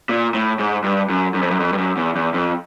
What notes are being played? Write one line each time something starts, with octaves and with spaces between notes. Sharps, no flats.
A#2
A2
G#2
G2
F#2
F#2
F2
F#2
F2
G2
F#2
E2
E2
F2